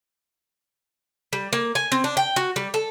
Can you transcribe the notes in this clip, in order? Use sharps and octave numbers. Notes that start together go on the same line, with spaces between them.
G3
A#3
G#5
C4
D4
G5
F#4
G3
A4